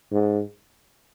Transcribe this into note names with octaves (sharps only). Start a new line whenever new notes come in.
G#2